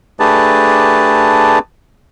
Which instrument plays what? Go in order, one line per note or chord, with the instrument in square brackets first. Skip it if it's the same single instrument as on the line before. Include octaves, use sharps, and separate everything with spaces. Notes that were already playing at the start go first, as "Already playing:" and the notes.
[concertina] A3 D4 G4 G#4 B4 A5